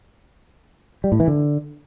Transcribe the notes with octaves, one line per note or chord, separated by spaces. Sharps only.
G3
A2
E3
D3